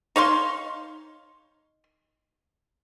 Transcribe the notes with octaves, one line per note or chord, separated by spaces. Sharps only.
D#4 C#5 F5 C6